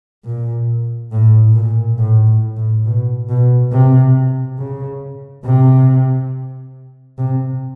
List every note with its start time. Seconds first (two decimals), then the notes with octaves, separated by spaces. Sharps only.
0.25 A#2
1.12 A2
1.55 A#2
1.98 A2
2.27 A2
2.57 A2
2.85 B2
3.29 B2
3.72 C3
4.58 C#3
5.45 C3
7.18 C3